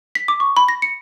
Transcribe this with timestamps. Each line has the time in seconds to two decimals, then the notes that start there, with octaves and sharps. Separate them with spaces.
0.15 B6
0.28 D6
0.40 C#6
0.57 B5
0.68 A#6
0.82 C#7